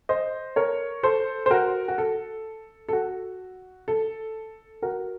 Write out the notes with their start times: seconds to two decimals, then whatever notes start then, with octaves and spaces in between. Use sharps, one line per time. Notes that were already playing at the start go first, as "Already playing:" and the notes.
0.09 C5 D#5
0.56 A#4 C#5
1.03 A4 C5
1.46 C5
1.51 F#4 A#4
1.88 F#4
1.98 A4
2.89 A4
2.93 F#4
3.88 A4
4.82 F#4 A#4